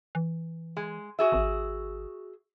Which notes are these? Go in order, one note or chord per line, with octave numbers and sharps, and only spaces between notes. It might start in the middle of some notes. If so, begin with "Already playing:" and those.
E3
G#3
F#4 G#4 E5
G#1